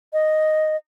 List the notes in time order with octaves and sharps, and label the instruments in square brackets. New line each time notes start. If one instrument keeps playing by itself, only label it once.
[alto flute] D#5